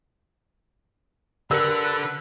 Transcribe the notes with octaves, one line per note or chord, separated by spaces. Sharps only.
D3 G4 A#4 B4 E6 C#7